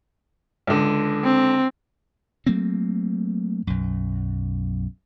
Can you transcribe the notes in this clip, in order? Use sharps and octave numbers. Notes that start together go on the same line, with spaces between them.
C#2 D3
C4
F#3 A3 A#3 C4
B1 F#2